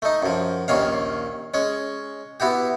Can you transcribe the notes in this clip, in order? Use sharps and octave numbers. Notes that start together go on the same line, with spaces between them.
A3 D#4
F#2 F3
A#1 D#2 D#3 C#4 F5
G#3 C#4
B3 E4 F#4 G4